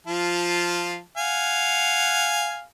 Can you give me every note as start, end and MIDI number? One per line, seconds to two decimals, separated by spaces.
0.07 0.99 53
0.07 0.99 65
0.07 0.99 81
1.17 2.64 77
1.17 2.64 78
1.17 2.64 80